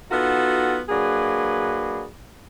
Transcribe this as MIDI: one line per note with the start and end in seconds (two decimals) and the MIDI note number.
0.11 0.79 59
0.11 0.79 63
0.11 0.79 65
0.11 0.79 66
0.11 0.79 69
0.89 2.05 54
0.89 2.05 58
0.89 2.05 62
0.89 2.05 68
0.89 2.05 71